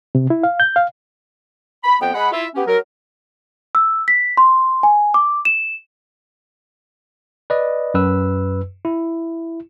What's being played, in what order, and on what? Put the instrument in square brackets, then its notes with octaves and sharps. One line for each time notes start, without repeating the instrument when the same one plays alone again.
[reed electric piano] C3
E4
F5
G6
F5
[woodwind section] B5
F2 B3 G5
G#3 F#5 B5
E4 F4 E5
B3 C#4 G4
F#3 A#4
[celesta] E6
B6
C6
G#5
D6
E7
[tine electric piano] B4 D5 D#5
F#2 B4 E6
E4